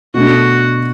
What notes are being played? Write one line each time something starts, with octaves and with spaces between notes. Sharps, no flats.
B2 A3 D4 F#4